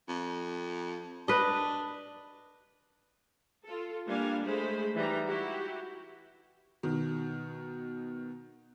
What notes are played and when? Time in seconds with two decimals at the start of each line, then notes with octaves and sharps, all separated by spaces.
0.09 F2
1.28 D4 B4 D#5
3.66 F4 A4
4.06 G3 A#3 D4 F5 G#5
4.44 G#3 A3 C5 B5
4.95 E3 G3 D#4 A#5
5.27 E4 F#4 G4
6.83 B2 D#3